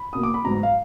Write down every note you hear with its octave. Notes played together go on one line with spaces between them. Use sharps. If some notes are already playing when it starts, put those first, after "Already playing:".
Already playing: B5
B2 A#3 D#6
D6
B5
G#2 F#3 B3 A#5
F5